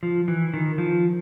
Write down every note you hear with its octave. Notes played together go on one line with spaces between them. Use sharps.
F3
E3
D#3
F3